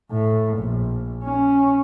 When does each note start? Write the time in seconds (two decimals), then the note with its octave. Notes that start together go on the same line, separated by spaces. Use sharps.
0.11 A2
0.59 A#1
1.24 C#4